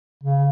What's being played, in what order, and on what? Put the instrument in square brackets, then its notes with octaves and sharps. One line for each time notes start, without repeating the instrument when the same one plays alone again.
[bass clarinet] C#3